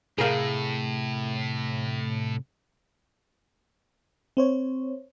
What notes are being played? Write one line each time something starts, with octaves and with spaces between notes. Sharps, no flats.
A2 C3 G#4 A#4 F5
C4 C5 C#5